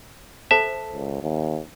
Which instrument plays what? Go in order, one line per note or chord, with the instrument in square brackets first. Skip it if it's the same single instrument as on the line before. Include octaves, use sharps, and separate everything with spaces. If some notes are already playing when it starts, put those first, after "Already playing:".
[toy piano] A4 C5 A5 [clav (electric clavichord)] E5
[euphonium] C#2
D#2